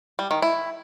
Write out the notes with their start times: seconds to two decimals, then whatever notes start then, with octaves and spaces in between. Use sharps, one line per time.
0.19 G3
0.31 D#3
0.42 E4